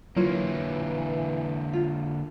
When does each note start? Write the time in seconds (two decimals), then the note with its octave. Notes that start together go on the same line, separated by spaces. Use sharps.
0.17 D3 E3 F#3 A#3 E4 F4 C#5
1.73 F4